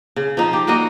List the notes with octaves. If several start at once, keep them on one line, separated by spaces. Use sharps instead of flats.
C#3
F3 D#4
G4
G3 A#3 F#4 D#5